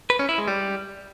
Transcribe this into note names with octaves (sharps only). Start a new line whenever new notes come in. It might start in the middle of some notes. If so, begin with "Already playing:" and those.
B4
C#4
E4
G#3
G3